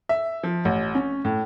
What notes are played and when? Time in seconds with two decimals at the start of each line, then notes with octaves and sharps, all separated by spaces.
0.09 E5
0.43 F3
0.65 A1
0.95 C#4
1.25 A2